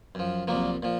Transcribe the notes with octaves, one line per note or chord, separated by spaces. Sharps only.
F#2 F3
C2 A#2 F3 F#3 A#3
A#2 F3